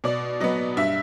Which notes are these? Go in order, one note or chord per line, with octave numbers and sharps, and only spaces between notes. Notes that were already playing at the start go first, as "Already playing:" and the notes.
B2 D5
F#3 B3 D#5
G2 E5